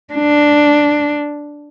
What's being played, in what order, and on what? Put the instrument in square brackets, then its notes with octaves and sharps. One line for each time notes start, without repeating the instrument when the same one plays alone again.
[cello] D4